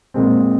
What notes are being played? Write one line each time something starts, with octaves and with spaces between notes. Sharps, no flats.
A#2 G#3 C4